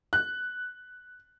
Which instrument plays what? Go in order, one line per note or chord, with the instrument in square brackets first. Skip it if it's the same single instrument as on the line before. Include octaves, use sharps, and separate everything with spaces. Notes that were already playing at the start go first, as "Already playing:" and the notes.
[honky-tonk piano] F#6